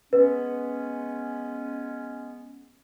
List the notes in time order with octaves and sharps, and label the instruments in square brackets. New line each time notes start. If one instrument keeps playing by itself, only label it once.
[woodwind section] G#3 B3 C#4 [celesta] B4